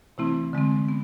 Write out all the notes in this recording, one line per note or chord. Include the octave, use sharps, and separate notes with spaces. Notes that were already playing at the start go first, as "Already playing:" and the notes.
C3 E3 A3 C4 E4
D3 G#3 C4
B3